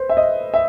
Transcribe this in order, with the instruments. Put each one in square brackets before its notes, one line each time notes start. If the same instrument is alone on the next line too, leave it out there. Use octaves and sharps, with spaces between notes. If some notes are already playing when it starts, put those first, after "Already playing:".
Already playing: [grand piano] B4 C5
E5
D#5
E5